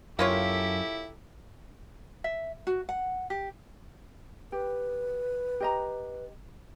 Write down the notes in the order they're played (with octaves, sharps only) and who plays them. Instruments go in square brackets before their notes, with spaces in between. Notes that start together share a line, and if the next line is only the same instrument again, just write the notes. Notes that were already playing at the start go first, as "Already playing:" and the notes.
[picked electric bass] F#2 [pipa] A#3 F4 C#5 [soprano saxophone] E4 [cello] G4 A4
[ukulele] E5
F#4
F#5
G4
[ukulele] G4 [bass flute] B4
[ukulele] G4 D#5 A#5